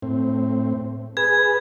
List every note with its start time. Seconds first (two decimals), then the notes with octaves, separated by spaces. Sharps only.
0.02 A2 C4
1.17 G#4 B4 G#6